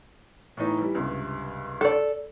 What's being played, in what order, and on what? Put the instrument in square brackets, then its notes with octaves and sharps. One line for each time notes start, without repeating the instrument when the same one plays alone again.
[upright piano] A2 E3 D#4
E3 G3
C#2 G2 C3
[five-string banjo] A4 D5